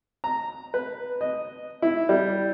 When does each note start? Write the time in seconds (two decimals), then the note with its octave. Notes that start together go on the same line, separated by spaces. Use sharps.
0.24 A#5
0.74 B4
1.21 D#5
1.82 E4
2.09 G3